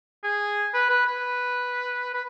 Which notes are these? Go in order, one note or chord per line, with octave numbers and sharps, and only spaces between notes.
G#4
B4
B4
B4
B4